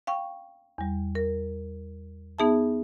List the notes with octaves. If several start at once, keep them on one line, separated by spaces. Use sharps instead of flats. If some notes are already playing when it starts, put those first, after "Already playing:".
F5 G5 C#6
E2 G3
A#4
B3 D#4 G#4 E5 A5